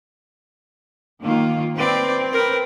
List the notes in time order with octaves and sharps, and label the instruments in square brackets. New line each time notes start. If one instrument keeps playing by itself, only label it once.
[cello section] D#3 A#3 F4
[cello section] C4 [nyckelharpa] B4 D5
[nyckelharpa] A#4 B4